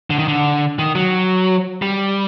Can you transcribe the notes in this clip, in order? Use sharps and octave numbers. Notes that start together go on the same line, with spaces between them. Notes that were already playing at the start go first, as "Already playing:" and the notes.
D3
D#3
D3
D#3
F#3
G3